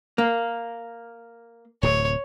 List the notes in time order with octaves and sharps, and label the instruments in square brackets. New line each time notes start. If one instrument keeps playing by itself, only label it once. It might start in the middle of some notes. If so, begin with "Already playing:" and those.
[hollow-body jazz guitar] A#3
[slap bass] D1 A2 C3 [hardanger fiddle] C#5